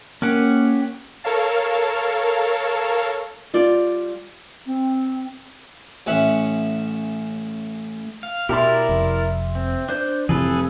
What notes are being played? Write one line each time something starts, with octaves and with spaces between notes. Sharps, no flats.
A#3 C#4 G4 F#5
A4 A#4 C#5 F5 A5
G3 F4 D5
C4
A1 C#4 E5 F#5
F5
B2 E4 G4 A#4 D5 E5 C6
F1
C4
D4 C5 G6
F1 E3 G3 G#4 A4 B4